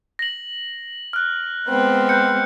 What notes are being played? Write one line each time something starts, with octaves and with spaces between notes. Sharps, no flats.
A#6 F#7
F6 F#6
G#3 B3 C4
F#6 G6 C#7